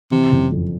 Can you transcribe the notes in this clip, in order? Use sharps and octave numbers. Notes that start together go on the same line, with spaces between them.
C3 E3
F#1
F2